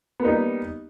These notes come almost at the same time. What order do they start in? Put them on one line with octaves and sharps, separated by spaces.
B3 A#3 D#4 G3